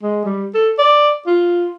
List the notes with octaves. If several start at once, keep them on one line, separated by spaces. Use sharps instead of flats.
G#3
G3
A4
D5
F4